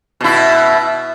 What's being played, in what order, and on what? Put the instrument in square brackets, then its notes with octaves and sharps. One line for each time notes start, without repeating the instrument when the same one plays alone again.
[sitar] B2 E4